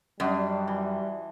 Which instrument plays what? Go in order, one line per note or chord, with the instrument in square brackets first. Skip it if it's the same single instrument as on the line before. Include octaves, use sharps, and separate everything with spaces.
[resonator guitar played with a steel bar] F#2 [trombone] G3 [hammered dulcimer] D4 F#4 D#5
[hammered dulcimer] E3